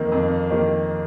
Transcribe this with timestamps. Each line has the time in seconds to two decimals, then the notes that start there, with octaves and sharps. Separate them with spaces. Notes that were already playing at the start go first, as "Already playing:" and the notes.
Already playing: F2 D#3 A#3
0.12 F2
0.50 D#3 A#3